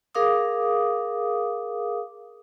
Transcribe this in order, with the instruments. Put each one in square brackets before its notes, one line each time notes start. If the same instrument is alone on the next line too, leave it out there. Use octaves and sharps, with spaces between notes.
[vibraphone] G#4 A#4 F5 D6 D#6